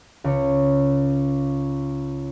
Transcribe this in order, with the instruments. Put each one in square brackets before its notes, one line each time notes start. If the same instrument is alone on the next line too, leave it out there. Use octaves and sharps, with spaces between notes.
[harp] C#2 C#5